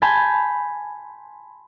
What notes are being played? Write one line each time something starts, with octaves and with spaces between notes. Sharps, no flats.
G#5 A5 B5 C6 G6 G#6